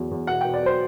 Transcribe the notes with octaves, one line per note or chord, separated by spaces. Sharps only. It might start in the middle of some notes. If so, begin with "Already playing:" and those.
Already playing: E2 F#3
E2
B2 F#5
G5
B2
D5
F#3 C5